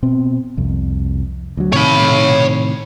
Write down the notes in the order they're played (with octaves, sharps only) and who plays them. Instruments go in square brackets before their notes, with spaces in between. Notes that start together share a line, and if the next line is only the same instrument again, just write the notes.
[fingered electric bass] B2 C4
C2 F2
D2 F#3
[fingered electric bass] A2 C3 D#3 [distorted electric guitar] C#5 B5